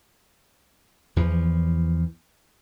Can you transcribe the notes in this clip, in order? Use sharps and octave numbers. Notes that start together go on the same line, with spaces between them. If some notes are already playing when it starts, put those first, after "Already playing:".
E2 E3 F3